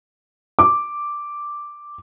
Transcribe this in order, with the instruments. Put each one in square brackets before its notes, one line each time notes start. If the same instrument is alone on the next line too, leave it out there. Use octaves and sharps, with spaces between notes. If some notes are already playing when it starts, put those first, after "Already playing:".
[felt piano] D6